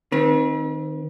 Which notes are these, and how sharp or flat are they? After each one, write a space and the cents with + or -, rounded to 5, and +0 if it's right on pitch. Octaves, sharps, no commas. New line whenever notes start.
D#3 -10 C4 +0 B4 -45